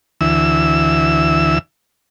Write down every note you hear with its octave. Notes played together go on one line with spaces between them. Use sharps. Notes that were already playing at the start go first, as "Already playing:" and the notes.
D2 E3 E6